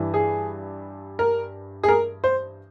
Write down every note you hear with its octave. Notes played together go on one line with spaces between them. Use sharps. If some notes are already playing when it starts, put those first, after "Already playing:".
Already playing: G2 E3 G3
G#4
A#4
G#4
A#4
C5